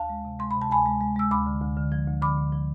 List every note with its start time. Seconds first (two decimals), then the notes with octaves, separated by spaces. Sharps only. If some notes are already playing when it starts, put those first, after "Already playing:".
Already playing: D2 F5 A5
0.09 G#3
0.25 C3
0.39 G#3 C6
0.51 C3 B5
0.62 A5
0.70 D2 G#5 B5
0.86 G#3
1.01 G#3
1.16 G#3 E6
1.31 D2 B5 D6
1.46 D3
1.61 D2
1.77 D3
1.92 F3
2.08 D2
2.22 D3 B5 D6
2.37 D2
2.52 F3